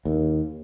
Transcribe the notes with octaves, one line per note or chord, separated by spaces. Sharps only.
D#2